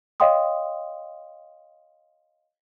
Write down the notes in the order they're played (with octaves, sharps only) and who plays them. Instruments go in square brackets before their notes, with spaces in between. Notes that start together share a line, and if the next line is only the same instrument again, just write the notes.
[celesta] C#5 D#5 F5 G5 C6 D#6